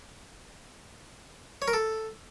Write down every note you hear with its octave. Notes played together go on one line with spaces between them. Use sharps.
C#5
A#4
A4